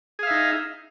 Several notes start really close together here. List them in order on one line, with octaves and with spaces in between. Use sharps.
G#4 F5 E5 D#4